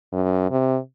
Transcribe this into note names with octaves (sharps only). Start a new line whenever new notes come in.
F#2
C3